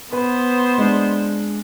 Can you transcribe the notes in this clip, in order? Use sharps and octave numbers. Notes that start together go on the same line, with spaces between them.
B3 B4 C5
G#3 D4